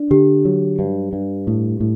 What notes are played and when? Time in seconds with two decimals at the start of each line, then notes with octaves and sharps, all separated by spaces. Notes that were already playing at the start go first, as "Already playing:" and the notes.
Already playing: D4
0.11 D3 G4
0.45 F#3
0.79 G2
1.13 G2
1.47 A2
1.81 A2